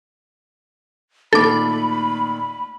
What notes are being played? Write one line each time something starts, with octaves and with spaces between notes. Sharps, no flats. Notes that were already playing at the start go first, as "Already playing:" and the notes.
A#2 D#3 A3 A4 B5 D6